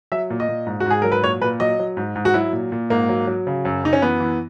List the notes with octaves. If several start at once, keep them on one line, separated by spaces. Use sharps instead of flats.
F#3 E5
A#2
D#5
A#2
G#2
F#4
G#2 G#4
F#3 A#4
B4
A#2 C#5
A#2 B4
F#3 D#5
F#3
G#2
G#2
F#4
F#3 E4
A#2
A#2
G#2 A#3
F#3
F#3
C#3
F#2
F#2 D#4
C#4
E3 B3
E3